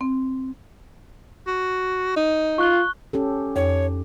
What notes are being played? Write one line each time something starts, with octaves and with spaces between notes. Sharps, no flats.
C4
F#4
D#4
F4 C#6 F#6 G7
C#4 G4 A4
F2 C#5